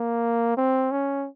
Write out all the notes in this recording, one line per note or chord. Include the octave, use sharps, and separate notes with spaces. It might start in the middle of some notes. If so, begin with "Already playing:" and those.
Already playing: A#3
C4
C#4